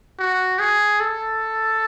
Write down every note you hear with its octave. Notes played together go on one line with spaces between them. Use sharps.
F#4
G#4
A4